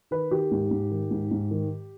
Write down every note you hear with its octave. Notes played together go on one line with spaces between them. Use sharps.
D#3 B4
D#3 G4
G#2
G#2
D#3
G#2
G#2
D#3